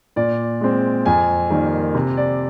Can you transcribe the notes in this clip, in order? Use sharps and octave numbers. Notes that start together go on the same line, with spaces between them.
A#2 D5
G#3 C4
F2 G#5
D#3 G3 A#3
C3
D5